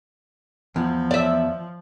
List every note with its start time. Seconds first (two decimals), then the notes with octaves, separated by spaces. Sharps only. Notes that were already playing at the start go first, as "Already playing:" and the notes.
0.76 E2 F3
1.11 D5 E5